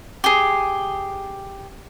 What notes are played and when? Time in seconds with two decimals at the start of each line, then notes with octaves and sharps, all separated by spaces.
0.24 G4 G#4